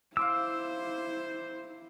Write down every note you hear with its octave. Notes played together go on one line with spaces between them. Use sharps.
E4 C5 F5 C6 D6 E6